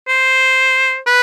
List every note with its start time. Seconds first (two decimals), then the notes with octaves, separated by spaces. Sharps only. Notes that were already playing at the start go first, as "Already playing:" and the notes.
0.08 C5
1.07 B4